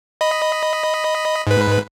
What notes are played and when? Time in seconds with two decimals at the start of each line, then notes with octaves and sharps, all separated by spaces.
0.21 D#5 B5
1.47 G#2 B4